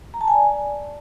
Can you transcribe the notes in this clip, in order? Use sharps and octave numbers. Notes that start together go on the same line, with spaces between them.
A#5
A5
G#5
D5